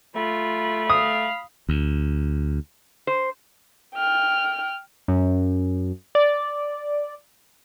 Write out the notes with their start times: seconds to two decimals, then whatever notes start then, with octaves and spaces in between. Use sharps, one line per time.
0.16 A3 F4 B5
0.90 F5 D#6
1.69 D2
3.07 C5
3.94 G5 F6
5.08 F#2
6.15 D5